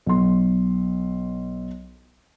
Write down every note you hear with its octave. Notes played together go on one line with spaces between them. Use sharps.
B1 C6